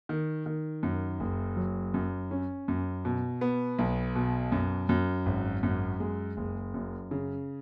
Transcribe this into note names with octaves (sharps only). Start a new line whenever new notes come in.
D#3
D#3
F#2
F#1
F#3
F#2
C#4
F#2
B2
B3
B1
B2
F#2
F#2
G#1
F#2
G#3
F#1
F#2
C#3